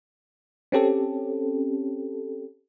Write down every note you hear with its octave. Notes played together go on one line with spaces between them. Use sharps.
C4 C#4 G4 A4